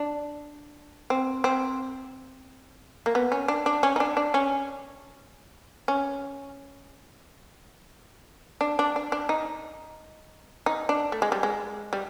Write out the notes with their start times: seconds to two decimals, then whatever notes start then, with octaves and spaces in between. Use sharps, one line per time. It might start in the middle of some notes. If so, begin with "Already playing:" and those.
Already playing: D4
1.10 C4
1.44 C4
3.06 A#3
3.15 B3
3.32 C#4
3.48 D4
3.66 D4
3.83 C#4
3.96 D#4
4.00 D4
4.17 D4
4.34 C#4
5.88 C#4
8.61 D4
8.79 D4
8.96 D4
9.12 D4
9.29 D#4
10.66 D#4
10.89 D4
11.12 A3
11.22 G#3
11.32 G3
11.43 G#3
11.93 G3